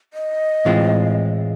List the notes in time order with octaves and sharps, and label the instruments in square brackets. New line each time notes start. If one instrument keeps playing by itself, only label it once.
[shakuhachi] D#5
[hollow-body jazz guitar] A2 E3 G#3 C4 F4